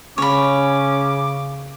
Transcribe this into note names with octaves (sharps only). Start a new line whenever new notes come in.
C#3 C#4 C#5 B5 D6